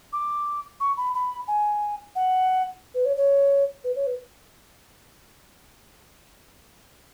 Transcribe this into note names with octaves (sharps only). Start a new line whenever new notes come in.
D6
C#6
B5
B5
G#5
F#5
B4
C#5
C#5
B4
C#5
B4